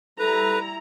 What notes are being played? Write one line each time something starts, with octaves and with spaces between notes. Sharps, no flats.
G3 E4 A4 B4 A#5